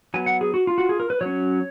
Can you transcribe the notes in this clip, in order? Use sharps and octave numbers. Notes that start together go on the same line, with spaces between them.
F#3 B3 G#5
F#5
G#4
F#4
F4
F#4
G#4
A#4
B4
F#3 C#4 C#5